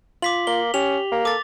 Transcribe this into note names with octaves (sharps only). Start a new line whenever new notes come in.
F4 D6 B6 F#7
A#3 G7
C#4 G4 F7
A#3
A4 D6 A6